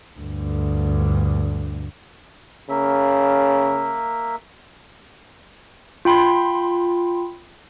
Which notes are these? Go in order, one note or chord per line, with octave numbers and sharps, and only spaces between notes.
D2 G2
C#3 A#3 E5
F4 G5 B5 C6